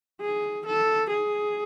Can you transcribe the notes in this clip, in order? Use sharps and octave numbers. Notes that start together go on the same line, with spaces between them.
G#4
A4
G#4